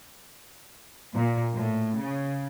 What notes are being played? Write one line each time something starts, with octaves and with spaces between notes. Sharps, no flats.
A#2
A2
C#3